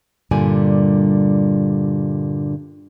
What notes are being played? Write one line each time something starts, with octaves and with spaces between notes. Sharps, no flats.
G2 A#2 D3 G3 D5 G#5